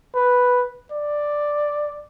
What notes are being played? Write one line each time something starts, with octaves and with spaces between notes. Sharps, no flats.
B4
D5